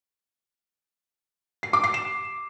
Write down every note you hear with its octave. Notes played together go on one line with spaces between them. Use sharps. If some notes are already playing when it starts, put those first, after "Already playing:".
C7
D6
C7
E7